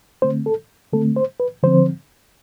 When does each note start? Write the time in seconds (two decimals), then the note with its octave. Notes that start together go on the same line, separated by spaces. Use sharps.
0.22 D3 A3 C4 C5
0.46 A4
0.93 D3 A3 C4 A4
1.16 C5
1.40 B4
1.63 D3 F3 C4 C5